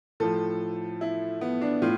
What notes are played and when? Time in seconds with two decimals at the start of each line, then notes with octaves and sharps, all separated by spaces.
0.20 A2 F3 A4
1.01 E4
1.41 B3
1.61 D4
1.82 A2 F4